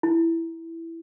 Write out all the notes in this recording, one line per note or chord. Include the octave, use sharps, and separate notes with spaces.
E4